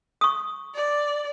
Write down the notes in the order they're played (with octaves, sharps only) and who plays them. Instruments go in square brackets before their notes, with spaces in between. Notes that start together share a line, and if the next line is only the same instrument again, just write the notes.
[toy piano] C#6 D#6
[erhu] D5